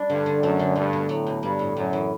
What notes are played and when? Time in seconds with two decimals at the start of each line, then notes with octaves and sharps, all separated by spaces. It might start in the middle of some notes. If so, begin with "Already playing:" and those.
Already playing: G3 D4
0.10 G2 D3
0.26 D3
0.42 F#2 A3
0.59 D3
0.76 G2 B2
0.93 B2
1.09 A2 F#3
1.27 B2
1.43 G2 G3
1.59 A2
1.76 F#2 A2
1.93 E3